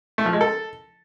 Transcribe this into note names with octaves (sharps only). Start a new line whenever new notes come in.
A3
F3
G#3
A4